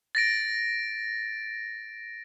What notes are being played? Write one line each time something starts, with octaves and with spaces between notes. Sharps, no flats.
A6 A#6 D7